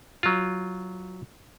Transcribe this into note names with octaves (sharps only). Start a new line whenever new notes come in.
F#3 F4